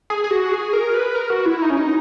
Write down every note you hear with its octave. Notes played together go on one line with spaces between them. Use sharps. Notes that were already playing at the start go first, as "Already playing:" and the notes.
G#4
G#4
F#4
G#4
A#4
B4
A#4
F#4
E4
D#4
C#4
D#4